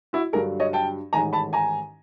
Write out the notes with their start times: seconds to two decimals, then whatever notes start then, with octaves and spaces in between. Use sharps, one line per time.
0.13 E4 F#4
0.33 G2 D3 F#3 G#4 A#4
0.60 C#5 D#5
0.73 G5 A5
1.13 A1 G#2 D#3 G#5 A#5
1.33 A5 B5
1.53 G#5 A#5